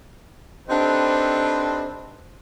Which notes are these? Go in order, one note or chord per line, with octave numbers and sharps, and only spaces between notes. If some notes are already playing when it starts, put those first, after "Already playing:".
C4 D4 D#4 G4 A4 B4